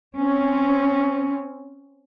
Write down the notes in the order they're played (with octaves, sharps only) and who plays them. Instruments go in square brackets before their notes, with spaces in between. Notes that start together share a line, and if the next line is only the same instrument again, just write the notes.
[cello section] C4 C#4